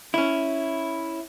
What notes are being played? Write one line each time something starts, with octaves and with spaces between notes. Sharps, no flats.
C#4 E4